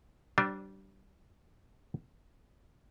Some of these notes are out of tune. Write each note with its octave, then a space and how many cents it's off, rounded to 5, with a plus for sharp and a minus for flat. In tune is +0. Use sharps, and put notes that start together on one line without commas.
G3 -25 D4 +0 C5 +10